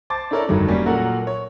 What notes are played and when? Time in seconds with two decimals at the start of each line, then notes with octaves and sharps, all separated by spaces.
0.10 C5 A5 D6 A6
0.31 D4 E4 A4 A#4 C#5 D5
0.49 F1 G2 D3 D#3 F#3
0.68 F#3 G3 A#3 C#4
0.86 A#2 F#3 F#4 A4 A#4 F#5
1.27 C#5